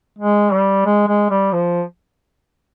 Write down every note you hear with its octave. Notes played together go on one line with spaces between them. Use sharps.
G#3
G3
G#3
G#3
G3
F3